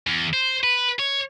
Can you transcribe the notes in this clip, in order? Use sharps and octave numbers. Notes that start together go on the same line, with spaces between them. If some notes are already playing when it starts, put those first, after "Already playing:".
E2
C5
B4
C#5